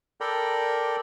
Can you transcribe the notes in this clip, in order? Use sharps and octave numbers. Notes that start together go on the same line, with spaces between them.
A4 A#4 D5 G5 A#5 B5